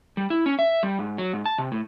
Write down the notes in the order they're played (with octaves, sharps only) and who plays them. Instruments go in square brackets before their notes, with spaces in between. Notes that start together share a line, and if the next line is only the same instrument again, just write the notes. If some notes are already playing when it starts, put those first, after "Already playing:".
[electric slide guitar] G3
E4
C#4
E5
G3
G#2
F#3
G#2
A5
C3
A2